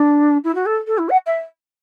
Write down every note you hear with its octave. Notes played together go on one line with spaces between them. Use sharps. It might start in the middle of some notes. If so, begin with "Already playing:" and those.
Already playing: D4
E4
F#4
A4
A4
E4
F#5
E5